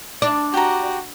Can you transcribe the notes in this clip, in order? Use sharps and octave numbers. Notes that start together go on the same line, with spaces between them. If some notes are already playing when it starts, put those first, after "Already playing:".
D4 D5
F#4 G4 A#5